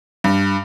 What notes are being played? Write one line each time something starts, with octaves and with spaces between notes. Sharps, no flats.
G2